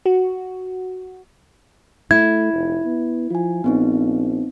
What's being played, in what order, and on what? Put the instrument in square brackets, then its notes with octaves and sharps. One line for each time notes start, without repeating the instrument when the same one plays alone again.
[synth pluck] F#4
[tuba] A3 [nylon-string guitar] E4 [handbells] G#6
[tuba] F1
B3
[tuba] F3 [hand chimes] F4 G#5
[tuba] A#1 [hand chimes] B3 C4 D#4